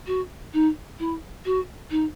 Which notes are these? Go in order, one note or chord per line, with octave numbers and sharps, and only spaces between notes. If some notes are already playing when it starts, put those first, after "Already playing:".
F#4
D#4
E4
F#4
D#4